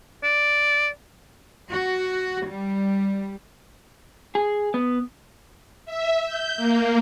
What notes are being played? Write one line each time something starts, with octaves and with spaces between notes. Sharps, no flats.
D5
F#4
G3
G#4
B3
E5
G6
A#3